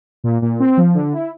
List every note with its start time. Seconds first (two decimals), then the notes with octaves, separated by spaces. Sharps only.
0.24 A#2
0.42 A#2
0.60 C4
0.77 F3
0.95 D3
1.13 E4